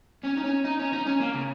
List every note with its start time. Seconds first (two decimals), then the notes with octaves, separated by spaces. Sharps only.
0.24 C#4
0.37 D#4
0.44 C#4
0.64 D#4
0.79 C#4
0.92 D#4
1.06 C#4
1.20 A#3
1.34 C#3